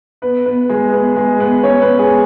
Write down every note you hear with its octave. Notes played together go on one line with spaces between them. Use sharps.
B3 B4
B3 B4
G#3 G#4
B3 B4
G#3 G#4
B3 B4
C#4 C#5
B3 B4
G#3 G#4